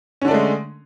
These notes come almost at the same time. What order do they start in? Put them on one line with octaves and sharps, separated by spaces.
C#4 D3 D4 A3 G#3